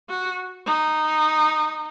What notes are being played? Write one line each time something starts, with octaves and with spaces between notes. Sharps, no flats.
F#4
D#4